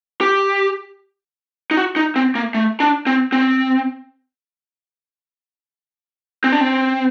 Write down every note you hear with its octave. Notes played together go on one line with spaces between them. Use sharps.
G4
D#4
F#4
D#4
C4
A#3
A3
D4
C4
C4
C4
D4
C4